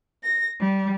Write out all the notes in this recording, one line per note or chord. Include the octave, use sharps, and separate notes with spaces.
A#6
G3